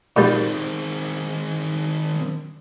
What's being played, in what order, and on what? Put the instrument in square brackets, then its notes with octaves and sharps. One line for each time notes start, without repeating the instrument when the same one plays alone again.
[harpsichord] A#2 G3 [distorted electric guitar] D#3 C4